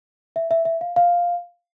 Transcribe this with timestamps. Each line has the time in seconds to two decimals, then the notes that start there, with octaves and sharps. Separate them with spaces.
0.36 E5
0.51 E5
0.65 E5
0.81 F5
0.96 F5